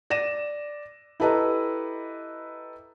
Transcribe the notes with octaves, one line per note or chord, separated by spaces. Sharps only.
D5 A#6 D#7 E7
E4 G4 A4 B4 D#5 A#5